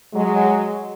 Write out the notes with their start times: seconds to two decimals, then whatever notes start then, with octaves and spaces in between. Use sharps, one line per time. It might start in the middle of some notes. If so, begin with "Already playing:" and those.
0.14 F#3 G#3